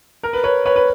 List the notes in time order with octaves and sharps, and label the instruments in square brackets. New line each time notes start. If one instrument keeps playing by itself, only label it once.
[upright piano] A#4
B4
B4 C#5
B4 C#5
B4